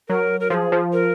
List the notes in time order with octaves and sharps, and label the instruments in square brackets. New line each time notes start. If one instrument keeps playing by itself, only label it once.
[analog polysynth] F#3 [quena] A#4
[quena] A#4
[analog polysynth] F3 [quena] A#4
[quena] G#4
[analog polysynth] F3
[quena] A#4